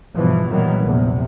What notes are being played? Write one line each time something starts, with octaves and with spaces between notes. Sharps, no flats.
E2 G2 B2 E3 F3
A#2 D#3 E3 F#3 G3 B3
A#1 E2 C3